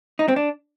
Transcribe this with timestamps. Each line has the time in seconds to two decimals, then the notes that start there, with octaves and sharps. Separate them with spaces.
0.19 D#4
0.28 C4
0.36 D4